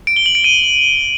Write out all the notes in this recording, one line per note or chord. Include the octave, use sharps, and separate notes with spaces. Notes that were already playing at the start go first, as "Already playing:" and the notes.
D7
G7
F#7
D7
D#7